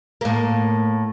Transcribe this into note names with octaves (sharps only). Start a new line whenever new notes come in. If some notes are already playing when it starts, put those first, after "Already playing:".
A2 A#3